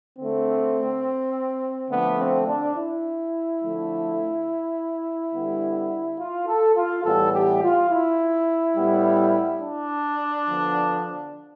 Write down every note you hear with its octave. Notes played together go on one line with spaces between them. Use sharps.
D3 C4
A3
D3 F3 A3 B3
C4
D4
E4
D3 F3 A3
D3 G3 B3
F4
A4
F4
A2 E3 G3 B3 A4
G4
F4
E4
A2 G3 B3
D4
D3 F3 B3